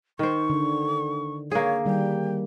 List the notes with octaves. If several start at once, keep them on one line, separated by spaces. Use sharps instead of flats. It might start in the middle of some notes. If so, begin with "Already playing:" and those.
D#3 C5 C#6
D3
A#3 G#4 C#5
D#3 G3 G5